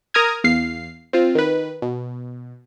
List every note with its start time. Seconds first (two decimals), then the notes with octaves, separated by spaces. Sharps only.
0.14 A#4 A#5 D#6 F6 G#6
0.44 E2 F5 C7
1.13 C4 F4
1.35 D#3 B4
1.82 B2